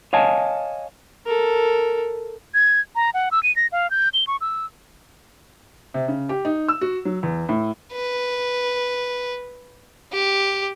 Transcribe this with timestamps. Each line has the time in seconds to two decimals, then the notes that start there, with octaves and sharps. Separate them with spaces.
0.13 C#5 D#5 F5 G#5 A5
1.26 A4 A#4
2.54 G#6
2.96 A#5
3.14 F#5
3.32 E6
3.43 D#7
3.56 A#6
3.72 F5
3.91 G6
4.14 G7
4.27 C#6
4.41 E6
5.94 C3
6.08 C#3
6.29 G4
6.45 D#4
6.68 E6
6.81 F#4
7.05 F#3
7.23 E2
7.49 A2
7.93 B4
10.13 G4